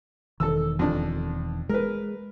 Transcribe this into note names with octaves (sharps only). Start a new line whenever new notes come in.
E1 D#3 A4 E6
F2 D4
G#3 A#4 B4